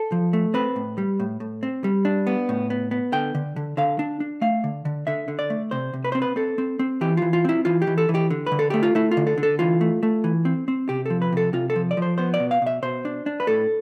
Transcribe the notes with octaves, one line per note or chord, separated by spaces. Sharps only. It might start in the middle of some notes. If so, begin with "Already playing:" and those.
Already playing: A4
F3
A3
C4 B4
A2
G3
A2
A2
C4
G3
D4
B3
A2
B3
B3
D3 G5
D3
D3
D3 F5
D4
D4
A3 F5
D3
D3
D3 E5
D3
D5
A3
C3 C5
C3
B4
C4 C5
B4
C4 A4
C4
C4
E3 G4
E3 F4
F4
C4 E4
E3 F4
G4
E3
A4
E3
G4
D3
B4
D3
A4
A3 G4
F4
A3 E4
F4
D3
A4
D3
A4
E3 F4
A3
A3
E3
C4
C4
C3 G4
F3 A4
B4
C3 A4
C3 F4
A4
F3
D5
F3 C5
B3 C5
D5
B2
F5
B2 E5
B2 C5
D4
D4
B4
A2 A4